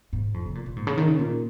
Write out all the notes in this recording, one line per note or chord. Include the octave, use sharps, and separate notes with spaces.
G#2
F2
C#3
A#2
A#2
G#2
C#3
D#3
C#3
A#2